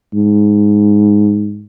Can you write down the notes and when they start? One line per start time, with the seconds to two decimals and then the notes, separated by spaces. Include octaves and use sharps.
0.14 G#2